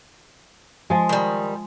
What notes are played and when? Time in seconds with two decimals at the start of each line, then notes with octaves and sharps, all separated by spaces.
0.90 F3 G#3
1.09 D#3 G3